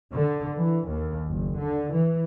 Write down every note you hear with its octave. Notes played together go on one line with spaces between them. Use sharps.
D3
E3
D#2
F#1
D3
E3